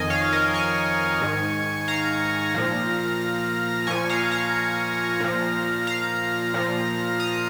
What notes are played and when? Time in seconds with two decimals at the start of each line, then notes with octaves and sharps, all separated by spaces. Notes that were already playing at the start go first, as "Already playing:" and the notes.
Already playing: F2 D#3 D#5 G#5
0.10 C#5 F5
0.32 A#4 D#5
0.54 G#5 C#6
1.21 G#2 D#3
1.88 F5 A#5
2.54 A#2 F3
3.87 A#2 F3 G#5 C#6
4.09 F5 A#5
4.31 F5 A#5
5.20 A#2 F3
5.87 F5 A#5
6.54 A#2 F3
7.20 A#5 D#6